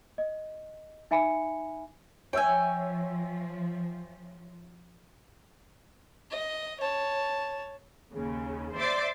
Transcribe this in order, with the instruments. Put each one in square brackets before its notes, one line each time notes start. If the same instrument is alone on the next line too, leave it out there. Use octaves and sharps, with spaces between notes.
[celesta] D#5
D#4 E5 G#5 B5 C#7
[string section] F3 [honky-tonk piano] C#5 E5 E6 [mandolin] G5 G#5
[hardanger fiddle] D#5
C#5 A5
[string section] D#2 C#3
C5 D5 E5 C6 D6